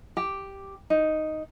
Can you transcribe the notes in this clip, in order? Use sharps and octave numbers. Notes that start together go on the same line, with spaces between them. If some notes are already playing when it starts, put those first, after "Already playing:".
G4
D#4